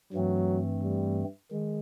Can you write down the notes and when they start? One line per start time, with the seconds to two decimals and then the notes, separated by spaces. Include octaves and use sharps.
0.13 G2 E3 F#3 A3 C4
0.82 G3
1.51 D#3 G#3